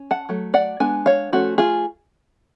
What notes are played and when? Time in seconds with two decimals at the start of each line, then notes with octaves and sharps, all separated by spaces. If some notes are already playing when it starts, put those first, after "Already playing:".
Already playing: C#4
0.11 F#5 A5
0.29 F#3 A3
0.54 D5 F#5
0.80 G#3 B3 D4 G#5
1.06 C#5 F5
1.32 F3 A3 C#4 F#4
1.58 F4 G#4